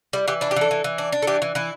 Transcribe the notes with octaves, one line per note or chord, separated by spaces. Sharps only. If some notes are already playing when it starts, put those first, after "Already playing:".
G3 E4
E3 G4
D4 E4
G4
E3 A4
E3
E3
D4
D4
A4
E3 G4
E3
E3 E4